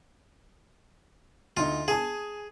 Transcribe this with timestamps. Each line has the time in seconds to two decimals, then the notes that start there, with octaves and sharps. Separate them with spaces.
1.57 D2 D#4 F4
1.88 G#4 G#5 A5 D#6